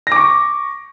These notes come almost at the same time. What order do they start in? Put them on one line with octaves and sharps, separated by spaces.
A#6 D6 C#6